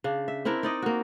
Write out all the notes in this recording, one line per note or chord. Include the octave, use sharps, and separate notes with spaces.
C#3 D4
E5
C4 D4 E4 A#4
D#4 D5 D#5
A#3 F#4